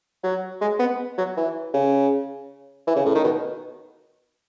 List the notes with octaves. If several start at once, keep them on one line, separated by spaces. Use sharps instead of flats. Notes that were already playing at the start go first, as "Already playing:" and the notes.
F#3
G#3
B3
F#3
E3
C#3
E3
C#3
A2
D#3
B2